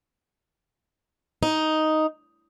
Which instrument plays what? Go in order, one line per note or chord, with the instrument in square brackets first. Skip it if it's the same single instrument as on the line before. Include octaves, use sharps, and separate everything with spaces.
[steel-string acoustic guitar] D#4